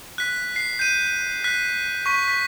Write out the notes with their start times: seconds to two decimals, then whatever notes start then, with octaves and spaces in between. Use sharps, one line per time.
0.18 F#6 B6
0.56 C7
0.79 G6 D#7
1.44 F#6 B6
2.06 C#6 B6
2.28 B6